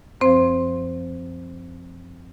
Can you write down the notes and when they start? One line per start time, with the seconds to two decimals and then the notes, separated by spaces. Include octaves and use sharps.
0.21 F#2 F3 C4 C5